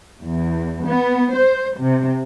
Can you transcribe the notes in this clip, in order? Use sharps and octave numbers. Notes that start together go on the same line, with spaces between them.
E2
B3
C5
C3